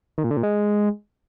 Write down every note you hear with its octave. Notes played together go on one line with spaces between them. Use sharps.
D#3
A#2
D3
A#2
G#3